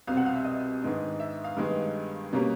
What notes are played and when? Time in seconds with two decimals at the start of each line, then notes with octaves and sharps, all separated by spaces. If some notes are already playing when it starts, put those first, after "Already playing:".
0.07 C2 B2 G3 C4 F5
0.17 F#5
0.26 F5
0.35 E5
0.45 D#5
0.82 G#2 D#3 G#3 B3 D4
1.20 E5
1.44 F5
1.57 G2 D#3 G#3 B3
2.33 B2 G3 A#3 C#4